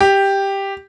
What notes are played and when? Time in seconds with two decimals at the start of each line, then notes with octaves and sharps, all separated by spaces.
0.01 G4